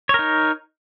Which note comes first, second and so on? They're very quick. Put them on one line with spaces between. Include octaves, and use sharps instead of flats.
C#5 A#4 D#4